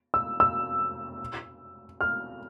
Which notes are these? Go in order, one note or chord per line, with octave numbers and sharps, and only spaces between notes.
E6
E6
F6